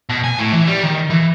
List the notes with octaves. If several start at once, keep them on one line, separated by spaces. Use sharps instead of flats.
B2
G#5
A2
E3
G3
D#3
E3